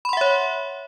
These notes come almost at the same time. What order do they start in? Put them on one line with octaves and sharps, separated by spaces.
B5 C6 F#5 E5 C#5